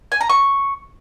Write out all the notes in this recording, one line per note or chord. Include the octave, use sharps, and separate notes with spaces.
G#5
A#5
C#6